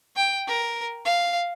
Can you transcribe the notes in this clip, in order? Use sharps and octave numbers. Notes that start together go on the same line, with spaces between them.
G5
A#4
F5